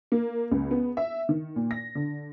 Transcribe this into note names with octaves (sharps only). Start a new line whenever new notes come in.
A#3
C#2
B3
E5
D#3
A#2
A#6
D3